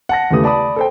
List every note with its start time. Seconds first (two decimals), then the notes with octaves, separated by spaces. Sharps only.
0.09 F#5 A5 A#6
0.31 E2 C#3 E3 A3 G4 D#6
0.44 D5 A5 B5 D#6
0.76 A4 C5 G5